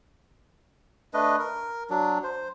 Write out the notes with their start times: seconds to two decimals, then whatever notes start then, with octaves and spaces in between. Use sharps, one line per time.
1.14 A3 D4 B4 D#5
1.39 A#4
1.90 F#3 D4
2.24 C5